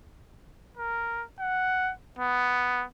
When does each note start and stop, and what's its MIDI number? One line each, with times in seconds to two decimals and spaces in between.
0.77 1.23 70
1.40 1.91 78
2.19 2.84 59